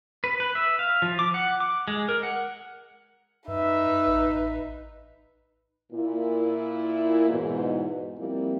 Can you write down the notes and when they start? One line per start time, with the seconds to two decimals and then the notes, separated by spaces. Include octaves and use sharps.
0.24 B4
0.40 B4
0.55 E5
0.79 F5
1.02 F3
1.19 D6
1.34 F#5
1.60 D6
1.88 G#3
2.09 A#4
2.23 F#5
3.48 F#2 D#4 B4 E5
4.07 A1
5.92 A#2 E4
7.28 E2 G#2 B2
8.18 F3 G3 A#3 C4 E4